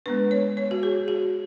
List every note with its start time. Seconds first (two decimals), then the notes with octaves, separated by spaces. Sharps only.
0.06 G#3 B3 D4 B4
0.31 C#5
0.57 C#5
0.71 F#4
0.83 G#4
1.08 F#4